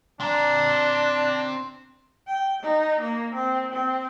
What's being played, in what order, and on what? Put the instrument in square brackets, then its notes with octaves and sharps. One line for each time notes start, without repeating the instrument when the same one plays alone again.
[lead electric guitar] C4 A#5 [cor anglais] D4
[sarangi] G5
D#4
A#3
C4
C4